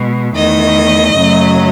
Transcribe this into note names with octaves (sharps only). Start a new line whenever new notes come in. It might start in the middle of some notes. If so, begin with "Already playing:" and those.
Already playing: B2 G#3
E2 D#3 A3 D#5
F#2 C#3 F#3 A3